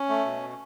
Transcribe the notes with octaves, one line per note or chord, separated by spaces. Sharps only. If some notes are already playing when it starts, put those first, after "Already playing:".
Already playing: C#4
A3
B2